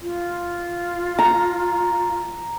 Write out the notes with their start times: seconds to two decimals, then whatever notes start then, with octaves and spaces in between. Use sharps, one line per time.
0.02 F4
1.19 A#5